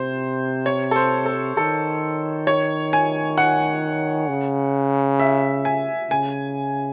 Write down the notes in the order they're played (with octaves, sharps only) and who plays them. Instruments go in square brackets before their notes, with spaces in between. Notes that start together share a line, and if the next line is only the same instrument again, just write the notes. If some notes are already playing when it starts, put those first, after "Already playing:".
Already playing: [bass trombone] C3 [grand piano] C5
[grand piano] C#5
A4
C5
A4
[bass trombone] D#3 [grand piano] A4
[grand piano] C#5
G#5
F#5
[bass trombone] C#3
[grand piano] E5
G#5
[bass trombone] C#3 [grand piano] G#5